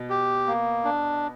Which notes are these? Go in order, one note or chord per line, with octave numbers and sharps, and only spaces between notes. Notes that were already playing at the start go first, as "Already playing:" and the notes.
Already playing: B2
G4
A#3
D4